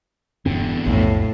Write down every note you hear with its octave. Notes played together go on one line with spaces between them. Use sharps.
E1 E2 G2 D3 C4
B1 F2 A2